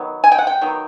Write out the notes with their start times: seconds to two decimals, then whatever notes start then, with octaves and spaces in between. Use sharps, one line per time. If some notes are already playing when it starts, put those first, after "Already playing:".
Already playing: D#3 F#3 B3
0.24 G#5
0.32 G5
0.39 F#5
0.47 G5
0.61 D#3 F#3 B3